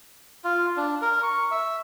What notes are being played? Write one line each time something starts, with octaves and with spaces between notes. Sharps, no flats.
F4
D4
A#4
C#6
E5